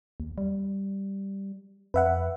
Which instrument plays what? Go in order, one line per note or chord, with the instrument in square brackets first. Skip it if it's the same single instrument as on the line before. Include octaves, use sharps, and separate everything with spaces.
[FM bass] D#2
G3
[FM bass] F2 [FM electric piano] B4 E5 F#5